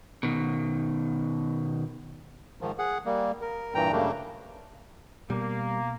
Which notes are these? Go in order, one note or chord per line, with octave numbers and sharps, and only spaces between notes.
B2 D#3
G#2 D#3 F3
G#4 F#5
G3 A#3
A#4
G2 A#2 E3 G5 A#5
F#2 C#3 G3 A3 A#3 D4
B2 G3 A#3